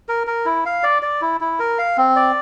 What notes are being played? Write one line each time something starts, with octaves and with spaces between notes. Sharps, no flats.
A#4
A#4
E4
F5
D5
D5
E4
E4
A#4
F5
C4
D5